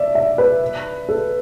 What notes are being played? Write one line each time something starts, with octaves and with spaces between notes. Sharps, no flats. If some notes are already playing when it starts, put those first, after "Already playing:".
Already playing: D5 E5
E5
B4
A4